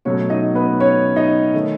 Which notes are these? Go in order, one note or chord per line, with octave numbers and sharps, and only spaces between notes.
B2 F#3 A3 C#4 C#5
D#4 D#5
B3 B4
C#4 C#5
D#4 D#5
D#3 A3 C#4